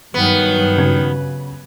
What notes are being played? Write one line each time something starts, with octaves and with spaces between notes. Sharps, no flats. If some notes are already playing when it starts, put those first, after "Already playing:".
G2 D#3 F#3 B3
C#3 F#4 G#6